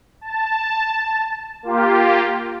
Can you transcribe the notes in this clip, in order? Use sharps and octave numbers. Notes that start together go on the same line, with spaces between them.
A5
A#3 F4 G4